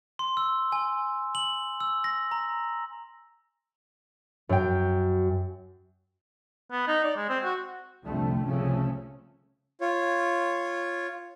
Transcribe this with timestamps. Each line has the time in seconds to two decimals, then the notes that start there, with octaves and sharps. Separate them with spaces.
0.19 C6
0.37 E6
0.72 G#5
1.35 F#7
1.80 E6
2.04 A#6
2.31 A#5
4.49 F#2 G5
6.72 B3
6.88 D#4
7.04 D5
7.16 G#3
7.29 C4
7.44 F#4
8.05 C2 F2 D3 G3 A3
8.45 C2 A2 C#3 F3 A3 C#4
9.81 F4 C#5